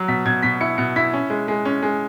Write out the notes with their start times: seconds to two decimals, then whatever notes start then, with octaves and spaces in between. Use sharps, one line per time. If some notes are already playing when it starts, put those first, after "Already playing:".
Already playing: F#3
0.08 B2 B6
0.26 B2 G#6
0.43 B2 B6
0.61 E4 C#7
0.78 B2 C#7
0.96 E4 B6
1.13 C#4
1.30 G#3
1.48 G#3
1.65 C#4
1.83 G#3